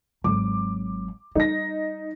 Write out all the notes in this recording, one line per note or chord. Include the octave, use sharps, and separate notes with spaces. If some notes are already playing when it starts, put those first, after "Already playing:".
G#1 F#3 D6
G3 D#4 A#6